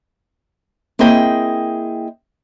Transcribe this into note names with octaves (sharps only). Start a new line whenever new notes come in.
A#3 C4 E4 G#4 D#5 G5